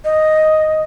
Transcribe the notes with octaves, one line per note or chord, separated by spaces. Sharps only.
D#5